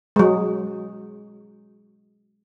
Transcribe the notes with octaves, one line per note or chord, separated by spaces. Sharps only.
F#3 G#3